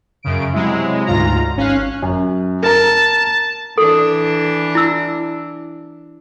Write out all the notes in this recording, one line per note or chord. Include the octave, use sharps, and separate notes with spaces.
F#2 C#3 D7
C3 F#3 G#3 E4
D2 G#2 F4 A#5
G#1 C#4 F5 F#6
F#2
A#4 A5 A#5
E3 D4 A4
E4 E6